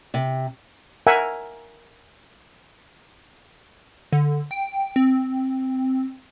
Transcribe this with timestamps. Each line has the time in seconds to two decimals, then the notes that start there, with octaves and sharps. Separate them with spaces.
0.14 C3
1.07 A#4 E5 F#5 G#5
4.13 D3
4.51 G5
4.96 C4